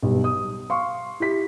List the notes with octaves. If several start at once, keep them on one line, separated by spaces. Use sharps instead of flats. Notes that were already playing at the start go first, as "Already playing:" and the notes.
B1 G2
D#6
F5 C6 C#6
E4 G4 B6